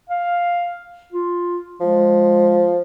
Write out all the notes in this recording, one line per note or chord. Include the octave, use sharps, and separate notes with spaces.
F5
F4
F3 G#3